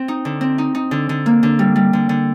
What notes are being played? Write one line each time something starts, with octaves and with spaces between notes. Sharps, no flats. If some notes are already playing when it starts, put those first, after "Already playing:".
Already playing: C4
D#4
D3
C4
D#4
D#4
D3
D3
A#3
D3
G3
G3
D3
D3